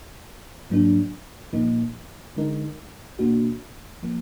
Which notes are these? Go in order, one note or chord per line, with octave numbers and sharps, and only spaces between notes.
G#2 F#3 A#3 D4
A#2 F3 A#3 D#4
D3 G#3 D#4 A#4
B2 A#3 D4 F#4
F3 A#3